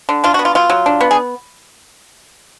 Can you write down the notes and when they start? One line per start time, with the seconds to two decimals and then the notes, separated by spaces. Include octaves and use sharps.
0.09 D3
0.24 D4 F4
0.34 B3 F#4
0.45 F4
0.55 F#3 F4
0.70 F#3
0.86 D4
1.01 B3
1.11 G#4